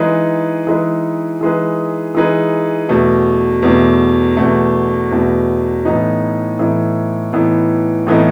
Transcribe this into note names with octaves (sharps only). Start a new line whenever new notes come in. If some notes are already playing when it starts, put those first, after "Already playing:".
Already playing: E3 G#3 D#4 G#4 B4
E3 G#3 D#4 G#4 B4
E3 G#3 D#4 G#4 B4
E3 G#3 D#4 G#4 B4
E2 B2 A3
E2 B2 A3
E2 B2 A3
E2 B2 A3
A2 E3 B3 D#4
A2 E3 B3 D#4
A2 E3 B3 D#4
A2 E3 B3 D#4